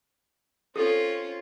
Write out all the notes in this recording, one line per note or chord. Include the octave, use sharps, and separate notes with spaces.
C4 C#4 F4 A4